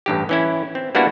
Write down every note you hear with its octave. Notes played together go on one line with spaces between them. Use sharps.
A1 G2 G4
E3 C#4 E4
C4
G3 A#3 B3 D4 E4 F#4